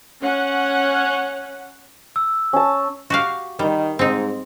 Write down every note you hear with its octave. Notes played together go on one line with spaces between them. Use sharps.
C#4 F#5
E6
C#4 A5
F#4 G4 F5
D#3 G3
G#2 C4 D#4